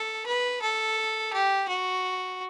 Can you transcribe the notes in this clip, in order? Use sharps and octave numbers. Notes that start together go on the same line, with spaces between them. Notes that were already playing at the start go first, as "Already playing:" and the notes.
Already playing: A4
B4
A4
G4
F#4